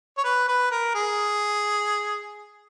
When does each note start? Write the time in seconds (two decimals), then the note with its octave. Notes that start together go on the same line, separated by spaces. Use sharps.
0.18 C#5
0.24 B4
0.48 B4
0.71 A#4
0.95 G#4